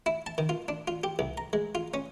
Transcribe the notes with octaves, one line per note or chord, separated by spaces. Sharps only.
E4
A5
D#3
F4
D4
F4
G4
C2
A#5
G#3
F4
C#4